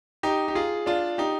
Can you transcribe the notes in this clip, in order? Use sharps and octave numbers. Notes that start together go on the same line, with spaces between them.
D#4 G4
G4
F4 G#4
D4 F4
D#4 G4